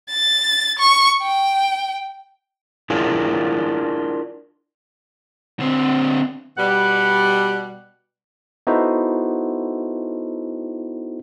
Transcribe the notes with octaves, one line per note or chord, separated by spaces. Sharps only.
A6
C#6
G5
D4 E4 F4 G#4 A#4
D3 C4
B2 G3 F#5
B3 D#4 E4 F#4 A4 C5